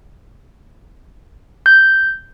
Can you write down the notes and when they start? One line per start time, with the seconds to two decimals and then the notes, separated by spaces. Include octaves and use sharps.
1.66 G6